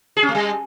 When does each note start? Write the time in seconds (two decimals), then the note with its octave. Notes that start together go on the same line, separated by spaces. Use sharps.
0.17 G#4
0.23 C#4
0.29 A3
0.35 G3